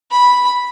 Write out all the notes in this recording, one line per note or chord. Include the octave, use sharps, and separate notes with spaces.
B5